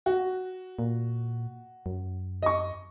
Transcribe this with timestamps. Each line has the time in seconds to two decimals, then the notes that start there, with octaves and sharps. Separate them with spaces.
0.06 F#4
0.79 A#2
1.86 F#2
2.43 D#5 C#6